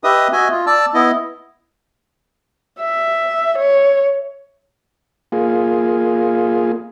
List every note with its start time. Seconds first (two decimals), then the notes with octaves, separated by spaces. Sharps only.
0.04 G4 B4 D#5 E5 D#6
0.32 F#4 D#5 E5 G#5
0.51 F4
0.67 D5 A5 E6
0.94 B3 E4 D#5
2.80 E5
3.59 C#5
5.32 A#3 F4 G#4